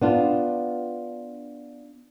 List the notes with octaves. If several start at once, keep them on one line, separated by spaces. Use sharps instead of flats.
B3 D4 F4